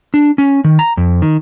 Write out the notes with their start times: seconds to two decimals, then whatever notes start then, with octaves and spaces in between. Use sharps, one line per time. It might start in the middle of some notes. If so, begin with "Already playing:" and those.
0.14 D4
0.38 C#4
0.64 D#3
0.79 A#5
0.97 F2
1.22 D#3